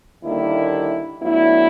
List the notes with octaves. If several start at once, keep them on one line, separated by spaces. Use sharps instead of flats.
D#2 D3 G3 A#3 D4 E4
A2 F#3 B3 D4 E4